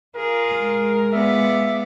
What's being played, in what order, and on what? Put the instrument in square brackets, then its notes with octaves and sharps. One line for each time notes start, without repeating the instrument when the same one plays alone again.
[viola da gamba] F4 G#4 [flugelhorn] A#4
[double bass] G#3
[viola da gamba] B3 F4 D5 [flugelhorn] E5